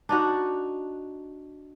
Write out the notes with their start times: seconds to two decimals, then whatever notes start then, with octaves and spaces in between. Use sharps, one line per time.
0.09 D4 D#4 F#4